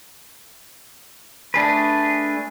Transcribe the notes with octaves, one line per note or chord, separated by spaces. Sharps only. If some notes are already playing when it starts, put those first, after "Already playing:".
A3 D4 G#4 B4